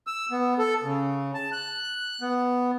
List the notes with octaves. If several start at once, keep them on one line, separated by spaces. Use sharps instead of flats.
E6
B3
A4
C#3
A5
F#6
B3